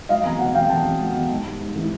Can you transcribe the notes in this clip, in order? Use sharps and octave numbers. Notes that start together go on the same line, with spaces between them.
F#3 D#5 F5
E2 G#5 A#5
B2 F#5 G#5
E2 F5 G5
E2 G5 A5
E2
F#3
E2
G#2
G3
G#2
E3